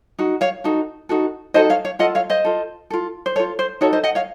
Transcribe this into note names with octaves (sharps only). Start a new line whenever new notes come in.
D#4 F#4
C#5 F5
D#4 F#4 A4
D#4 F#4 A4
D#4 F#4 A4 C5 D#5
C#5 F5
C#5 F5
F4 A4 D#5 F#5
C#5 F5
C5 D#5
F4 A4
F4 A4
C5
F4 A4 C#5
C5
D#4 F#4 A4 C#5
C5 D#5
D#5 F#5
C#5 F5